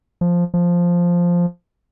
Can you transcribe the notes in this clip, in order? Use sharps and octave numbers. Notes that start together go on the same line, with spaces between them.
F3
F3